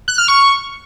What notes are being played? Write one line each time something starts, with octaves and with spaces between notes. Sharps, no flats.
F#6
F6
C#6